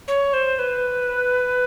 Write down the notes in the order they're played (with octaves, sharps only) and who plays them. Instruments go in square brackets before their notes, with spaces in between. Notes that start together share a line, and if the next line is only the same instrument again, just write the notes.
[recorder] C#5
C5
B4